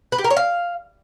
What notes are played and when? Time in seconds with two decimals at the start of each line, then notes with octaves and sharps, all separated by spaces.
0.12 B4
0.18 G4
0.24 A#4
0.30 C#5
0.37 F5